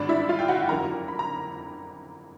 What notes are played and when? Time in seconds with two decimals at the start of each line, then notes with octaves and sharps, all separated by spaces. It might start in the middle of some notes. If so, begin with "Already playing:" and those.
Already playing: G#1 G2 D3 D4 D5
0.09 E4 E5
0.29 F4 F5
0.39 G5
0.48 F#4 F#5
0.69 F#1 F2 D3 A#4 A#5
1.08 B5
1.19 A#5